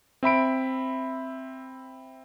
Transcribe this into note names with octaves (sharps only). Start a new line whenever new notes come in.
C4 E5 B5 D7